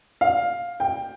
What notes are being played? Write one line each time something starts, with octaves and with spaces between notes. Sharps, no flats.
F5
G5